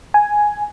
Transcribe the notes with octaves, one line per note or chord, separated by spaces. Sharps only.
G#5